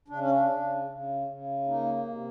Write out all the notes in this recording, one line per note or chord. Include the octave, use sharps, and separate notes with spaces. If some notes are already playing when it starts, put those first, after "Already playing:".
C#3 D4
C#4
D4
C#3
C#3
C#3
A#3 D#4
C3